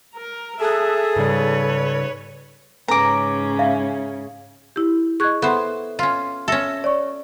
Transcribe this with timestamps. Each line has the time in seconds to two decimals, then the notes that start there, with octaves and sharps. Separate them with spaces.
0.15 A#4 A#5
0.60 G#4 A4 E5 A5 D#6 F#6
1.16 G#2 C#3 G3 B4 C#5
2.88 G#2 C#3 C#4 B4 G#5 A#5 D6
3.59 E5 F5
4.76 E4 G4
5.20 G#4 D#5 C#6 F#6 G#6
5.42 B3 A4 C5 E5
5.99 C#4 F4
6.48 C#4 A4 E5 A#6
6.84 C#5 D5 C#6